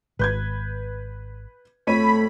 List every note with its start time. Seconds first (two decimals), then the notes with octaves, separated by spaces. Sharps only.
0.19 G#1 B4 G6 G#6
1.87 F2 A3 C#5 B5 D#7